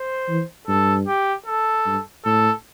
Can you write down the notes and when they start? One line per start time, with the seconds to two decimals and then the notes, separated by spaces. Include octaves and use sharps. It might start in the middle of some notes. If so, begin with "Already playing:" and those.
Already playing: C5
0.29 E3
0.68 G2 A4
1.07 G4
1.46 A4
1.86 G2
2.25 A2 A4